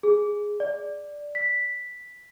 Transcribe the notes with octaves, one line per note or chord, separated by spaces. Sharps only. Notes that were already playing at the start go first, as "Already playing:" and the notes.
G#4
D5
B6